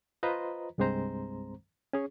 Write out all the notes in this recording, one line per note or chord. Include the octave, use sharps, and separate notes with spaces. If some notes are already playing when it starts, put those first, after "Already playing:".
F4 B4 C5 D#5 A#5
C2 G2 G#3 C4 C5 A#5
C#4 G#4